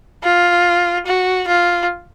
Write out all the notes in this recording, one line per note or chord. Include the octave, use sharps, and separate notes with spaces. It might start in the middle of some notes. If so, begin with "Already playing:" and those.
F4
F#4
F4